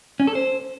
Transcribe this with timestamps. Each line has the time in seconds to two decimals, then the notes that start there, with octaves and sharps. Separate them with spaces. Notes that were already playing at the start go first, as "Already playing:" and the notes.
0.20 C#4
0.27 A4
0.35 C5